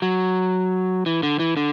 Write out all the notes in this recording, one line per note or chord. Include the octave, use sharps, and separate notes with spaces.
F#3
E3
D3
E3
D3